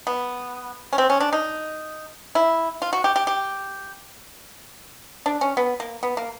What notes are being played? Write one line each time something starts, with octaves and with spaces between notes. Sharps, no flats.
B3
C#4
C4
C#4
D4
D#4
E4
F4
F#4
G4
G4
G4
D4
C#4
B3
A#3
B3
A#3